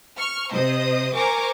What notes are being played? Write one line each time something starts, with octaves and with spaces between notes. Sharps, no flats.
C#6 F6
C3 C5 D#5 D#6
A#4 C5 G#5 A#5 C#6 D6